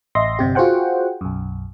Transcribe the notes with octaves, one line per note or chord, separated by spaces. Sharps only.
A1 D#5 E5 C6 A#6
G1 C3 G4
F4 F#4 G#4 C5 F#5 G5
B1 F#2